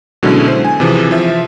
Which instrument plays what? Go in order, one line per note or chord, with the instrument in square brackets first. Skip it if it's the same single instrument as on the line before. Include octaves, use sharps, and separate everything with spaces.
[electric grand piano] B2 D3 F#3 G#3 C#4 E4
C5
G#5
C3 E3 F3 G#4
F3 E5